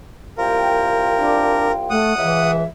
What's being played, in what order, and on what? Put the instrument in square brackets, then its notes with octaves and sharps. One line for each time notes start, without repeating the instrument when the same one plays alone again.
[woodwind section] C2 F4 G5 [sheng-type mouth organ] A#4
[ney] D4
[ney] A3 [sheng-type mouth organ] F#5 D#6
[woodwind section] C#2 E3 [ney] E5